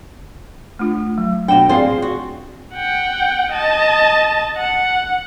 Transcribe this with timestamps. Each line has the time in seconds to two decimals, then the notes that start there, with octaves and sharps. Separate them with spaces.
0.79 A3 D4 F4
1.18 F#3
1.48 B2 D4 F#5 G5
1.69 C4 F4 G#4 C5 D5
2.02 F#4
2.74 F#5 G5
3.52 D#5 A5
4.58 F#5